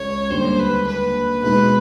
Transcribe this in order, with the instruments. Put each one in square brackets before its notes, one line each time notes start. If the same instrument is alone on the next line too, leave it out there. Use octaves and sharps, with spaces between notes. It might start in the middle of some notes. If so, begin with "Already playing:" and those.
Already playing: [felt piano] C#2 [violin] C#5
[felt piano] D#2 D3 G3 [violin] C5
[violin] B4
B4
[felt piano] B2 G#3 B3 D#4 [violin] B4